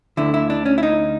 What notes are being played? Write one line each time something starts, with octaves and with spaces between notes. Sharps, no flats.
D2 D3 E4
E4
D4
C#4
E4
D#4